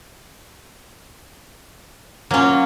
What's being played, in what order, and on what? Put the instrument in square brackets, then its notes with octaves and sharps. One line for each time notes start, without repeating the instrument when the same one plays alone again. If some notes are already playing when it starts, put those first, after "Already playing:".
[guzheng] F#3 F4 [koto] A#3 C#4